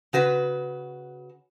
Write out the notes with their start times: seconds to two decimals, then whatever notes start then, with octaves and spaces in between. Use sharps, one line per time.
0.13 C#3 F#4 B4